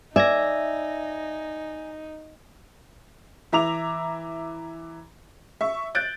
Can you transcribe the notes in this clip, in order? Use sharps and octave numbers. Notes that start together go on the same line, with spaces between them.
D#4 D5 E5 G#5 G#6 A#6
E3 E5 A#5 D6 F7
E5 C#6
F#6 G6 A6 D7